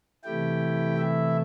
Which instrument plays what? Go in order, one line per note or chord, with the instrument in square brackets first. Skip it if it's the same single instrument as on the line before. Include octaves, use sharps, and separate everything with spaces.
[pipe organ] C3 E3 A3 E4 G4 G5
E4 E5